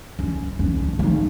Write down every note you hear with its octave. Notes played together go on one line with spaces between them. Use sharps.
C#4
C#4
D4
D#4